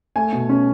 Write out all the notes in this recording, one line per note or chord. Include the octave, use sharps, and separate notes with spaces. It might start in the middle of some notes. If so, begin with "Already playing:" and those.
A3 G#5
B2
C#4